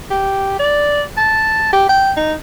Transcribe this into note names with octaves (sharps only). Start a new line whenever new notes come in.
G4
D5
A5
G4
G5
D#4